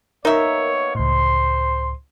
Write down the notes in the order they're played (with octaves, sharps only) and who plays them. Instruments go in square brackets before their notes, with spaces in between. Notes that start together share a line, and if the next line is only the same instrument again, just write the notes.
[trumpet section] A#3 B3 C#5 [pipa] D#4 E5 [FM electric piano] A#4
[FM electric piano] C#2 A2 [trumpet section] C5 C6